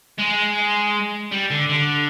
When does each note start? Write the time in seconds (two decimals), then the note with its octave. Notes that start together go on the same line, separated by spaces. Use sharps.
0.18 G#3
1.31 G3
1.50 D3
1.69 D3